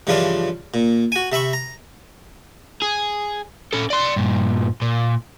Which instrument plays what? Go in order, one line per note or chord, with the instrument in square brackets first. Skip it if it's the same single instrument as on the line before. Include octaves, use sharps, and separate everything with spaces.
[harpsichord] G2 C#3 E3 F3 D4 F4
A#2
F#4 G#5
C3 E5 B5 C#6
A#5
[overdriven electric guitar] G#4
C#4 A4
D5 C6
G2 A#2
A#2